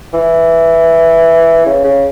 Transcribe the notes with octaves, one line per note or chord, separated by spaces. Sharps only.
E3
C#3
C#3